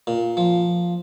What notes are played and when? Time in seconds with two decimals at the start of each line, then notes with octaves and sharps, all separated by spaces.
0.07 A#2
0.37 F3